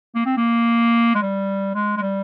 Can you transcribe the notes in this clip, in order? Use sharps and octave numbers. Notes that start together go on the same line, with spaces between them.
A#3
C4
A#3
G#3
G3
G#3
G#3
G3